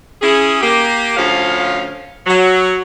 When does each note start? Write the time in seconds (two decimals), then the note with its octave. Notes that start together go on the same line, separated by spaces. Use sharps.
0.22 C#4 E4 G#4
0.61 A#3 G4
1.16 D2 F3 C#4 F5
2.27 F#3